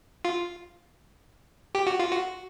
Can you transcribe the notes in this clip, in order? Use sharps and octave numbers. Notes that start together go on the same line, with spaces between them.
F4
G4
F#4
F4
F#4